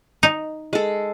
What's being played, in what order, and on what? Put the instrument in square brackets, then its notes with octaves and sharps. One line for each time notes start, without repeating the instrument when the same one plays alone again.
[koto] D#4
[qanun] G#3 A4